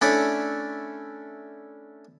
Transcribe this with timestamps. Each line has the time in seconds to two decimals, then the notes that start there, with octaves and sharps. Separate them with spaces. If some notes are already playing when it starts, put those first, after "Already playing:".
0.01 A3 C#4 D4 E4 C#5 D5